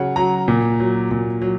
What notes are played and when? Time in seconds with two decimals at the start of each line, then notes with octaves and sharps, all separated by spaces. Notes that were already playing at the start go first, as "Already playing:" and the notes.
Already playing: C#3 F#3 C#5 F#5
0.16 F#3 F#5 A#5
0.48 A#2
0.80 F#3
1.11 A#2
1.42 F#3